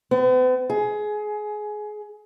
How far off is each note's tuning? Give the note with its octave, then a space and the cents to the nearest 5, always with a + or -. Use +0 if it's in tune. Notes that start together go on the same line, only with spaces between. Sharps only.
B3 +45
G#4 +20